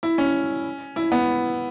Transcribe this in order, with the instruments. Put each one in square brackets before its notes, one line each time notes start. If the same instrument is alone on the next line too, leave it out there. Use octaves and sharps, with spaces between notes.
[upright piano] E4
C#4
E4
B3